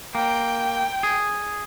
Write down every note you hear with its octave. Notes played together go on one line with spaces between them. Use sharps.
A#3 G5
G#4